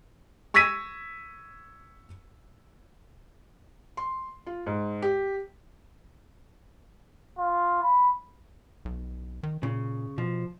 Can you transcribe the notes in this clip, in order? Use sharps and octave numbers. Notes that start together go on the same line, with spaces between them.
C#6 E6 G#6 A#6 B6 D#7
C6
F4
G#2
G4
F4
B5
B1
D#3
A#2 C#3
B2 F3